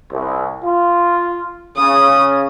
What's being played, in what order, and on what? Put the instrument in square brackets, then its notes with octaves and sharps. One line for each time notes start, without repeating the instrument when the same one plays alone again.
[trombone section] C2
F4
[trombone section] C#3 [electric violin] D#6